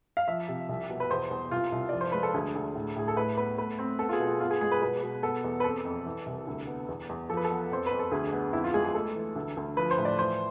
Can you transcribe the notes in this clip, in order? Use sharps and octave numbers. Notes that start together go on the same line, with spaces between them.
F5
F3 E5
C3
C2
B2
B4
E2 C5
E2
C2 F4
C2
F3 D5
C5
G#3 B4
A4
D2 G#4
D2
A2
A2 G#4
A4
A2 B4
B3 B4
A3 B4
C4
B3 A4
F4
G#4
B2
F4
B3 F4
G#4
G#3 G#4
B4
B2 B4
B2
B3 A4
E2
B4
C4 A4
F2
E3
C2
D2
B3
E2
E2
F3 A4
B4
A4
B3
F2 C5
B4
F2
A4
D2 G#4
B3
F2 E4
F4
G#3 G#4
G#4
A3 A4
E3
D2
D2
F3 B4
C5
A2
D5
E3 C5